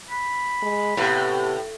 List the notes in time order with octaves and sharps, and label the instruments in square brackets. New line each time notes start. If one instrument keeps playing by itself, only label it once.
[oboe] B5
[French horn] G#3
[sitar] A2 [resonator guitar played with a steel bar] C3 B3 [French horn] G4